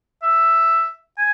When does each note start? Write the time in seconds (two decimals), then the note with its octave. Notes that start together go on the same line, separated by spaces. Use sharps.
0.22 E5
1.18 G#5